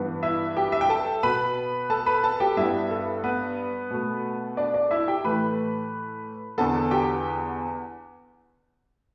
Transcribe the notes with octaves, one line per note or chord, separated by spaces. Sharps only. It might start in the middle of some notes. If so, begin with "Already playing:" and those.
Already playing: G2 E3 B3
E4 E5
G4 G5
E5
G5
A4 A5
B2 B3 B4 B5
A4 A5
B4 B5
A4 A5
G4 G5
G2 G3 B3 E4 E5
A4
B3 B4
B2 A3
D4 D5
D4 D5
E4 E5
G4 G5
A2 E3 A3 B4 B5
E2 D3 B3 A4 A5
G4 G5